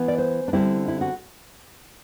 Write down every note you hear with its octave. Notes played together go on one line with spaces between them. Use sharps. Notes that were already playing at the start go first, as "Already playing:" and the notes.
Already playing: E3 B3
D5
C5
D4
D3 G3 C4 E4
E4
F#4